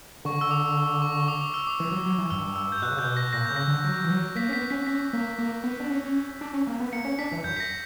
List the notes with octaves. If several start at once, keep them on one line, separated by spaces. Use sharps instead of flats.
D3 C#6
E6
D6
E6
C#6
D6
D6
E6
D6
E3
F#3
F#3
E3
G2 E6
E6
G6
B2 F#6
C#3
B2 G6
A#6
A#2 A#6
G6
C#3
A#6
D3
F#3
E3
F#3
A#3 B6
C#4
B3 B6
C#4 B6
C#4 B6
A#3
A#3
B3
D4
C#4
D4
C#4
A#3
B3
A#3 C#7
C#4
D4 B6
E3
F#2 G6
B6
A#6